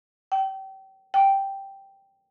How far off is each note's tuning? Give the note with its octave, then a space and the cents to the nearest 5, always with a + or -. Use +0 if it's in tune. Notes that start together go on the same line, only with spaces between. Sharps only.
G5 -30
G5 +0